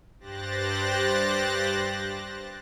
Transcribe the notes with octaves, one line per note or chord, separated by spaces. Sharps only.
G2 G4 C5 F#6 A6 A#6